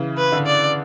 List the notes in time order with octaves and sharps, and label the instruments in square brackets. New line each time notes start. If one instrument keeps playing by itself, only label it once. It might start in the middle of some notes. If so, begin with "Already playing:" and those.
Already playing: [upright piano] C#3 E3
[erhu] B4
[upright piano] D3
[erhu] D5